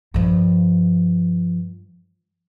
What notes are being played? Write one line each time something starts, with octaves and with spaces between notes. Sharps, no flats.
G2 F3